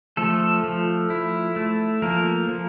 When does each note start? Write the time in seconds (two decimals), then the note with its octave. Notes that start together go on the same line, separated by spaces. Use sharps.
0.17 F3 A3 A4
0.64 F3
1.10 E4
1.56 A3
2.02 F3 A#3 A#4
2.49 F3